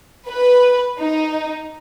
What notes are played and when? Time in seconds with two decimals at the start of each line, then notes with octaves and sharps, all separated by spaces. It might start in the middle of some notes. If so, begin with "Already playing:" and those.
0.29 B4
1.00 D#4